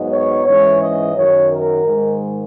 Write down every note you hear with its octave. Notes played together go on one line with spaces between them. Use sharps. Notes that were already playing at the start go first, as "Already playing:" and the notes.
Already playing: G#2 F#3 B3 D#4
C#5
G#2 E3 G#3 C#4 C#5
D#5
F#2 D#3 F#3 C#5
A#4
G#2 D#3 G#3